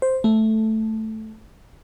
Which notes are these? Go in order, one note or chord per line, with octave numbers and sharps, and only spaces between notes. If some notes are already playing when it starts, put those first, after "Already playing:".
C5
A3